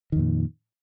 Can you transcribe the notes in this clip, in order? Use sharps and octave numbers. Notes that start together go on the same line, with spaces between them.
F2 A#2 D#3